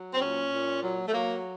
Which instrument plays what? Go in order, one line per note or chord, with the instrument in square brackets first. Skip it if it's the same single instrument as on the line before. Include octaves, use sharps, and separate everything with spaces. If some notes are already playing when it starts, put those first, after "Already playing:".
Already playing: [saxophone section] F#3
C4
A#2 C#4
A#2
F#3
A3
F#3 A#3